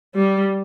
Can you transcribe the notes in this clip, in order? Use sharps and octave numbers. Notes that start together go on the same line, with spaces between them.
G3